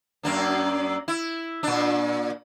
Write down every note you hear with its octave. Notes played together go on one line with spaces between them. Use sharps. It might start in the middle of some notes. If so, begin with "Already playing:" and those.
F#2 A#3 D4
E4
A#2 D4